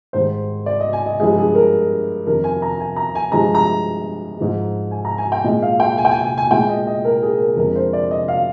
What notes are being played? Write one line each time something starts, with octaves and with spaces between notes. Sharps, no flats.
G#2 D#3 G3 C5
D5
D#5
G#5
D#5
G2 F3 G#3 G#4
G#4
A#4
F2 D#3 G3 A#4
G#5
A#5
G#5
A#5
G#5
G2 F3 G#3 A#5
A#5
G#2 F3 G#3
G#5
A#5
G#5
G5
A#2 G#3 D#5
F5
G5
G#5
G5
G#5
G#5
G#5
A#2 G#3 G5
D#5
D#5
A#4
G#4
A#4
F2 D3 G#3 A#4
C5
D5
D#5
F5